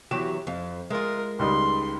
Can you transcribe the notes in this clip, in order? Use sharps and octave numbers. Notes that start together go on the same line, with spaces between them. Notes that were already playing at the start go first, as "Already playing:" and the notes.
E2 F#3 G4 E7
F2
G#3 F4 A#4
C#2 G3 D#4 C6